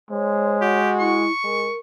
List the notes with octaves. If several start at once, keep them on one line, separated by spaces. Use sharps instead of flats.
G#3 C5 C#5
F#4 G4
E4 C#6
G#3 A#4